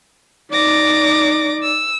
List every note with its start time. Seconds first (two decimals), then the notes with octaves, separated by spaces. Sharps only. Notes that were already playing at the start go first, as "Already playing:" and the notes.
0.52 D#4 D5 D6 A#6
1.63 E6